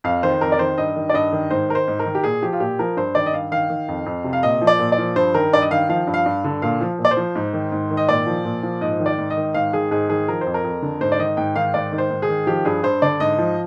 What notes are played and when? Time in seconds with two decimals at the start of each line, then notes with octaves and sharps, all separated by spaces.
0.04 F2 F5
0.23 D#3 C5
0.41 F2 A#4
0.52 D5
0.59 D#3 C5
0.78 G2 D#5
0.96 D#3
1.10 D5
1.14 G2 D#5
1.33 D#3
1.51 G#2 C5
1.69 D#3 A#4
1.75 C5
1.88 G#2
1.99 A#4
2.05 D#3
2.15 G4
2.24 A#2 G#4
2.42 F3 G4
2.53 F4
2.60 A#2 G4
2.79 F3 A#4
2.97 G2 C5
3.15 D#3 D5
3.26 D#5
3.33 G2 F5
3.51 D#3 F5
3.70 D#3
3.88 F2
4.06 F2
4.24 C3
4.33 F5
4.43 A#2 D#5
4.62 F3
4.67 D5
4.80 A#2
4.92 D5
4.98 F3
5.16 G2 C5
5.34 D#3 A#4
5.53 G2 D5
5.62 D#5
5.71 D#3 F5
5.89 F3 F5
6.07 G2
6.14 F5
6.26 G2
6.44 D3
6.62 A#2 F5
6.81 F3
6.99 A#2
7.05 D5
7.11 C5
7.17 F3
7.35 G#2
7.53 D#3
7.72 G#2
7.91 D#3
7.97 D#5
8.08 A#2 D5
8.27 F3
8.45 A#2
8.63 F3
8.81 G#2 D#5
9.00 D#3
9.06 D5
9.18 G#2
9.30 D#5
9.37 D#3
9.54 G#2 F5
9.73 D#3 G#4
9.91 G#2 G#4
10.09 D#3 G#4
10.28 F3 A#4
10.41 C5
10.46 F2
10.54 A#4
10.64 F2
10.82 D3
11.01 G#2 C5
11.12 D5
11.19 D#3 D#5
11.37 G#2 G5
11.56 D#3 F5
11.74 G#2 D5
11.92 D#3
11.98 C5
12.11 G#2
12.22 G#4
12.29 D#3
12.47 F3 G4
12.65 G2 G#4
12.83 G2 C5
13.02 D3 D5
13.20 G#2 D#5
13.39 F3